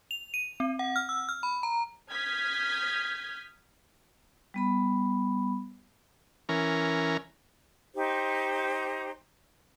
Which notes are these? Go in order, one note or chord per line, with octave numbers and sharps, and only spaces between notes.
F7
D#7
C4
F#5
F6
E6
F6
B5
A#5
D#6 F6 G6 G#6 B6
G3 B3 B5
E3 C#4 A#4
D#4 G4 C5